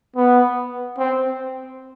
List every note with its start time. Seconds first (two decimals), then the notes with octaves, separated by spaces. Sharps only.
0.16 B3
0.98 C4